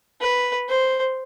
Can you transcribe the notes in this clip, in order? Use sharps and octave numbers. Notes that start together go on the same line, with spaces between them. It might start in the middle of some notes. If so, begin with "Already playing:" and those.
B4
C5